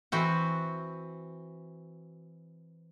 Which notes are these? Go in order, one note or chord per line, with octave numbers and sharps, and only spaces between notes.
E3 C4 F#4